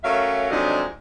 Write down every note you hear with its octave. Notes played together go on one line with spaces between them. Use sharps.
F#3 A3 C#4 A#4 E5 F5
F2 C3 F#3 G#3 D4 D#4